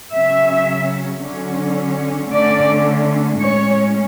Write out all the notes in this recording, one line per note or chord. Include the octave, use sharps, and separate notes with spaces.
C#3 F#3 C#4 E5
D3 F#3 C#4
D3 A3 C#4 D5
A2 G#3 C#4 C#5